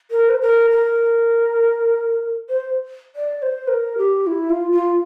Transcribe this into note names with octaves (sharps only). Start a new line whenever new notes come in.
A#4
C5
A#4
A#4
C5
D5
D5
C5
A#4
G4
E4
F4
F4